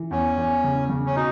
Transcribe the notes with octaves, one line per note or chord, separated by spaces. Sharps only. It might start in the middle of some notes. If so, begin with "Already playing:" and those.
Already playing: E3
E2 C#4
E2
C#3
C#3
C#4
B2 D#4